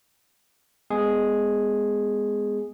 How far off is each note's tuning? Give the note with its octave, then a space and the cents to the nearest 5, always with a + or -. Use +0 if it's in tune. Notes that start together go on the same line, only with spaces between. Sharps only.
G#3 +0 B3 +20 G#4 +0